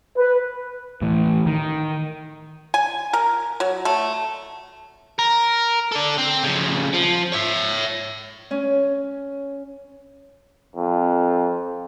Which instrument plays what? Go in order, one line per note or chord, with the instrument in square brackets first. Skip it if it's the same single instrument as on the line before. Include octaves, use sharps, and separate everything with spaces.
[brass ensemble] B4
[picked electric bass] A2 E3
D#3
[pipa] G#5
A#4
F#3
A3
[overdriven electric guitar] A#4
A4 D5
C4
F2 C#3
F3
C#5 E5
[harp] C#4
[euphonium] F2